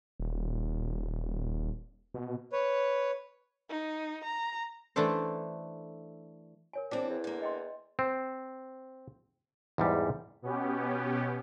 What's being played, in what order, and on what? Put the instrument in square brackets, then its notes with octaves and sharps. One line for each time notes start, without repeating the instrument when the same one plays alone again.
[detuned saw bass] D#1
B2
[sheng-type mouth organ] B4 C#5
[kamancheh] D#4
A#5
[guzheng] E3 A3 D4 A4 C5
[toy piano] A#4 C#5 G#5
[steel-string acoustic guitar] E3 C4 [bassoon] D4 [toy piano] G#4 G5
[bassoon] E2
[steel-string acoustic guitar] D3 A#3
[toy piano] D#5 G5 C6
[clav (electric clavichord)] C4
E2 G#2 G3
[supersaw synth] B2 B3 C#4 G4